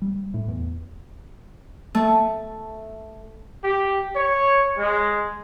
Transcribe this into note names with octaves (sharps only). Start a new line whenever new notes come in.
G3
A2
E2
A3
G4
C#5
G#3